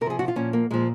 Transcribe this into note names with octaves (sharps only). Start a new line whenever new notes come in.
C3 A#4
F3 G#4
F#4
F4
A#2 F3 C#4
A#3
A#2 F3 G#3